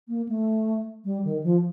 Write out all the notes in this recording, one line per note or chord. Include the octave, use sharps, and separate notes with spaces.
A#3
A3
G3
D#3
F3